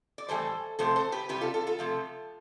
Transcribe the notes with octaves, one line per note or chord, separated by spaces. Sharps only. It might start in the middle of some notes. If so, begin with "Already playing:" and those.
D5
A2 E3 G3 A4 C5
C3 F3 A3 A4 C5
A4 C5
G4 B4
C3 G3 G4 B4
F4 A4
F4 A4
F4 A4
C3 F3 A3